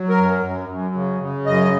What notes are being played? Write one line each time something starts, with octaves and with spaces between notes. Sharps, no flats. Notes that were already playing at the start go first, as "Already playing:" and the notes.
Already playing: F#3
A#4
F#2
F#2
F#2
C#3
C#3
F#2 D#5